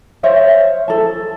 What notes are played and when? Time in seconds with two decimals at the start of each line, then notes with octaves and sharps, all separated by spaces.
0.23 C5 C#5 E5 F5
0.88 A4 A5